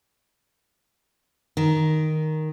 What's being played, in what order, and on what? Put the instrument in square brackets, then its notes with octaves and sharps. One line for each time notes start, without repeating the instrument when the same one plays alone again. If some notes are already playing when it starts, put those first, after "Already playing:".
[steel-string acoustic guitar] D#3